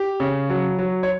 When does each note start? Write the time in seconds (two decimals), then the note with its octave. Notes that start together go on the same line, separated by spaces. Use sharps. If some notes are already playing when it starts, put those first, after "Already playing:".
Already playing: G4
0.20 C#3
0.50 F#3
0.78 F#3
1.03 C#5